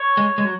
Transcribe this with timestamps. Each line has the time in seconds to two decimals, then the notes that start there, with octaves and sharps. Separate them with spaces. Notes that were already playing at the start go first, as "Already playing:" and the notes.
Already playing: C#5
0.17 G#3
0.38 G#3
0.45 F#3